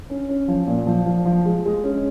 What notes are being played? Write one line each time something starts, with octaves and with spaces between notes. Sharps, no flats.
C#4
C#4
F3
A#2
F3
F3
F3
G#3
G#3
C#4